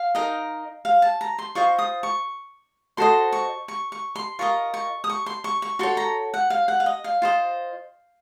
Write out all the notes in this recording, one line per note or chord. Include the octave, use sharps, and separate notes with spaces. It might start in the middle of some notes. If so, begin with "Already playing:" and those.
Already playing: F5
D#4 A#4 D#5
F5
A5
A#5
C6
F4 C5 D#5 C#6
D#6
C#6
F#4 A4 C5 D#5 C6
C#6
C#6
C#6
C6
F4 A#4 D#5 C#6
C#6
D#6
C#6
C6
C#6
C#6
F#4 A4 C#5 C6
A#5
F#5
F5
F#5
F5
D#5
F5
F4 C5 D#5